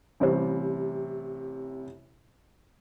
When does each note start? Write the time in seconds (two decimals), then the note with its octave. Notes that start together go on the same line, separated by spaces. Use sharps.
0.20 A1 C3 G3 C5